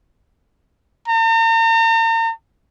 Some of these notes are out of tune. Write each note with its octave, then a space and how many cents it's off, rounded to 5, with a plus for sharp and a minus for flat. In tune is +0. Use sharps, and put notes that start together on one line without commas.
A#5 -45